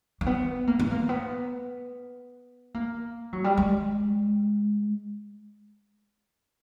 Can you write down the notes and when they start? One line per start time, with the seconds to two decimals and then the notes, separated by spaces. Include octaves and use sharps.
0.21 A#3
0.26 B3
0.67 A#3
0.79 B3
0.91 A#3
1.09 B3
2.74 A#3
3.33 F#3
3.44 G3
3.57 G#3